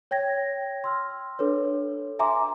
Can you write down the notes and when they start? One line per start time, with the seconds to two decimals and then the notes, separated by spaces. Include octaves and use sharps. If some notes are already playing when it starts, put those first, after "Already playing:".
0.11 C#5 G5 G#6 A#6
0.84 C6 E6 F6
1.39 D4 A4 B4 C#5
2.19 E5 G#5 A#5 C6 D6